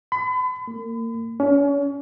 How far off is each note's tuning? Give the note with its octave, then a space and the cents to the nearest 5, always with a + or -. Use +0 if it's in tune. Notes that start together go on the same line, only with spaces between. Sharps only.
B5 +40
A#3 -35
C#4 +35